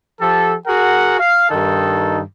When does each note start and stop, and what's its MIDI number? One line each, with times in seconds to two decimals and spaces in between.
0.21 0.55 53
0.21 0.55 67
0.21 0.55 69
0.67 1.18 66
0.67 1.18 68
0.67 1.18 70
0.67 1.18 78
1.20 1.47 77
1.50 2.21 43
1.50 2.21 51
1.50 2.21 63
1.50 2.21 69